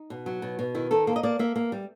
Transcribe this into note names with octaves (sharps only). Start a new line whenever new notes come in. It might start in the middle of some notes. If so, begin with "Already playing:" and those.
Already playing: D#4
B2
F#3
B2
B2
D#3 E4
D#3 A4
A#3 A4
D#5
A#3 D5
A#3 E5
A#3
G3